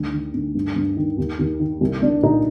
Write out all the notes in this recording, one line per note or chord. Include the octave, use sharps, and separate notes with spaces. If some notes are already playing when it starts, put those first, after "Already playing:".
Already playing: D2 D#3 G3
D#3
D2
G2
G2
D#3
D#2
D#2
D#3
C2
C2 D4
A#2 D#4